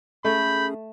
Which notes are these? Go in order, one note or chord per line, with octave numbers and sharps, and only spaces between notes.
A3 C#4 G#4 B5 G6